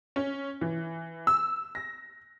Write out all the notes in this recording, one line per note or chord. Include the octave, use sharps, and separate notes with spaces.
C#4
E3
E6
A#6